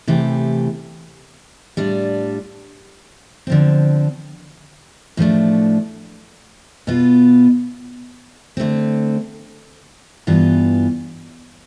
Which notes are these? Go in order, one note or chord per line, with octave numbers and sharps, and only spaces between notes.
C3 E3 A3 E4 G4
A2 G3 D4 F4
D3 F3 C4
A2 F3 A3 D4
B2 B3 F4
D3 A3 C4
G2 E3 B3 F4